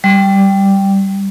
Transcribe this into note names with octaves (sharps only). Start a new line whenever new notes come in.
G3